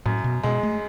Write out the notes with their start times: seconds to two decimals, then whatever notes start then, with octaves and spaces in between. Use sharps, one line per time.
0.06 F#2 A2
0.24 B2
0.43 B2 G#3
0.63 A3